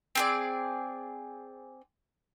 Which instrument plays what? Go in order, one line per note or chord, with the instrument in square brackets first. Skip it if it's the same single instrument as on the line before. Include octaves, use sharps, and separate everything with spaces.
[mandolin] C4 G#4 D5